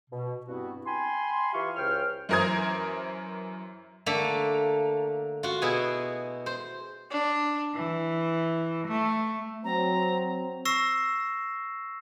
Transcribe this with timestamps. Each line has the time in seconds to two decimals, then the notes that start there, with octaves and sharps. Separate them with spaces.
0.10 B2
0.46 G2 B3 C4 E4 F#4
0.86 G5 G#5 B5 C6
1.54 E3 F4 G4 E5 F5 C#6
1.76 C#2 C5 C#5 G5 F6
2.29 F#2 E3 A#4 C5 D#6 G#6
4.06 D3 A3 A#3
5.43 F4 F#4
5.62 B2 E4 G#4 G#5
6.46 C5
7.10 D4
7.74 E3
8.86 A3
9.64 F#3 C4 A#5
10.65 C#6 E6 A#6 C7 E7